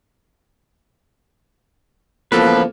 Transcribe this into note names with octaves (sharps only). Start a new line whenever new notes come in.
C#2 E3 F3 A#3 B3 A4 B4